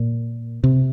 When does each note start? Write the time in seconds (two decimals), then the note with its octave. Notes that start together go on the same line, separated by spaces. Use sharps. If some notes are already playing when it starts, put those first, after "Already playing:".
Already playing: A#2
0.64 C3